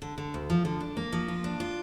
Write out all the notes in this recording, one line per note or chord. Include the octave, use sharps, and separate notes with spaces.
D3
D3
D2
F3
D3
D4
A#3
F3
F4
D4
F4